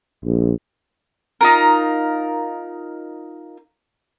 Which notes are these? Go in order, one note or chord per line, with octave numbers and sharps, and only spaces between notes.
A#1
D#4 F4 A#4